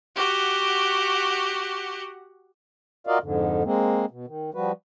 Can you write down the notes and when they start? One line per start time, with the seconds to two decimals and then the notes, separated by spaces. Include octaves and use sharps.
0.15 F#4 G4 F#5
3.07 F4 F#4 A#4 D5 D#5 F5
3.22 F2 G#2 D3
3.64 G#3 A#3 C4
4.10 B2
4.27 D#3
4.54 F3 G3 F#4 B4